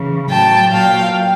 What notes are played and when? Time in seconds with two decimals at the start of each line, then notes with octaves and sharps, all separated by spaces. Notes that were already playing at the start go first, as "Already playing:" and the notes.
Already playing: C#3 E3
0.29 A2 F#3 G5 A5
0.72 A#2 F#3 F5 G5